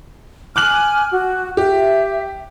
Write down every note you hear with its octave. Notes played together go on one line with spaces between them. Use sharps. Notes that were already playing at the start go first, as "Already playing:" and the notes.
G#5 D6 F6 F#6 F#7
F#4
G4 E5